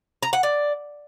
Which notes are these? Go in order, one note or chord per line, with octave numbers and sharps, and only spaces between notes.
A#5
F#5
D5